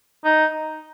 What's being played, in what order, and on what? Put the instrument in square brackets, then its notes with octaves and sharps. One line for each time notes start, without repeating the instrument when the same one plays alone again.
[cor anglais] D#4